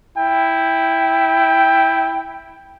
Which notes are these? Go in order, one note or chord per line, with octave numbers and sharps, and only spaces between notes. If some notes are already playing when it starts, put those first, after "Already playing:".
E4 G5